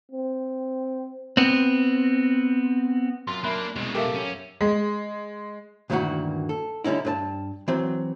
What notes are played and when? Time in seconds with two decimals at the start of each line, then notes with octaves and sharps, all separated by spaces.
0.11 C4
1.37 B3 C4
3.27 F#2 F4 C6
3.44 A#3 D4 E5 B5 F#6
3.76 C2 B2 G#3 C4 C#5
3.95 F#2 G4 A4 A#4 E5 F5 D6
4.15 C#4
4.61 G#3
5.90 D2 G2 A#2 D#3 E3 F#4
6.49 A4
6.84 D3 G3 C#4 D#4 E4
7.05 G2 B4 A5
7.68 E3 F#3 C4